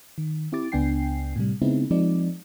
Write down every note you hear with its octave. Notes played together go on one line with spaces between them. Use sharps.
D#3
C4 E4 G4 D6 A6
C#2 B3 D4 G5 G#5 C7
A2 C3 G3
C#3 G#3 B3 C4 D#4 E4
F3 G#3 C4 D#4 D5